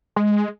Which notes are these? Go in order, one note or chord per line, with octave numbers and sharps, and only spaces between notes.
G#3